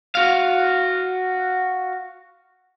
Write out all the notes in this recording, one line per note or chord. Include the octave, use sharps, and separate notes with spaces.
F#4 F5